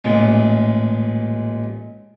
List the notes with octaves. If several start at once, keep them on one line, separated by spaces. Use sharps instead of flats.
A1 A#2 G#3